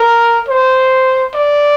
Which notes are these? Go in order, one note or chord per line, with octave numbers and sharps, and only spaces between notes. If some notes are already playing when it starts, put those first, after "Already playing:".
Already playing: A#4
C5
D5